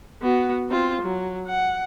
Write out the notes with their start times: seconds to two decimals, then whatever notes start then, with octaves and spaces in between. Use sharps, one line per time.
0.22 B3 F#4
0.70 C4 F4
1.02 F#3
1.47 F#5